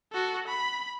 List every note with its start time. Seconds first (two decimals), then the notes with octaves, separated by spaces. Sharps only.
0.12 F#4 A4
0.47 B5